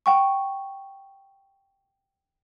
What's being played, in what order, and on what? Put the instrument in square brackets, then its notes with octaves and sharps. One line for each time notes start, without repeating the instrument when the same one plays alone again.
[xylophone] F#5 G5 C#6